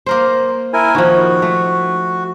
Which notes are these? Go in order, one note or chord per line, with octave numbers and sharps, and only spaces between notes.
A#3 A#4 C5
E4 A#4 G#5
D#3 F3 F#4
A3